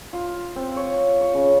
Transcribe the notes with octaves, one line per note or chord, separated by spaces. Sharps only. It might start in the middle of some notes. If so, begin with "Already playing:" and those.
F4
C4
C#5
C#5
C#3